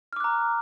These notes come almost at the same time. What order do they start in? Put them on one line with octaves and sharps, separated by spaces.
F6 D6 F#6 A#5